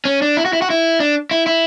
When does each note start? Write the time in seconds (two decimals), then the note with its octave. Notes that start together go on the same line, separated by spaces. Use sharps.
0.05 C#4
0.22 D4
0.37 E4
0.45 F#4
0.53 E4
0.62 F#4
0.70 E4
1.00 D4
1.31 E4
1.47 E4